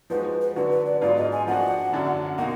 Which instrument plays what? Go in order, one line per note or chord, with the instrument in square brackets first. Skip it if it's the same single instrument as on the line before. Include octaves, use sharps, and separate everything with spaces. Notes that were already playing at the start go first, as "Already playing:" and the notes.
[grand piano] F3 G#3 D#4 F#4 [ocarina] B4
[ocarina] B4
[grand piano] D3 F#3 D4 F#4 [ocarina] B4
[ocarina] B4
D5
[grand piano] G#2 F#3 B3 D4 F4 [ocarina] D5
[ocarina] D#5
G#5
[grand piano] F3 A#3 D4 F#4 [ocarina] F#5
[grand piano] F#2 D3 F#3 D4
[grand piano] B2 A#3 D#4 F#4 [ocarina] F#5